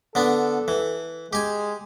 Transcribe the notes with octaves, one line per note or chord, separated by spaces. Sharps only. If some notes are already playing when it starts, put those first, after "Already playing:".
D3 B3 D4 A4
E3
G#3 G4 G#5